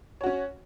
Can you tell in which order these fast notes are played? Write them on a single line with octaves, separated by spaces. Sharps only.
C#5 F#4 C#4